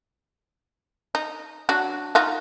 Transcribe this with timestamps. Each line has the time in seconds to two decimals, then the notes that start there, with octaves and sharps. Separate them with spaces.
1.15 D#4
1.69 F#3 D4 F#4
2.15 D#4 F4 F#4